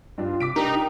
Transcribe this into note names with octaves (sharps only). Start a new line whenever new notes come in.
G2 D4 F4
C3 D6 B6 D7
D4 D#4 G4 A#4 G5 A#5